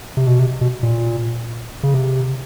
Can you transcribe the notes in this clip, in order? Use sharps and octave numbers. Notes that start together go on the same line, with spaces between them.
C3
B2
C3
B2
A#2
C#3
C3